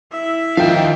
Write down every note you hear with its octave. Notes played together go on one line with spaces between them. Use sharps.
E4 E5
D#3 F3 F5 G5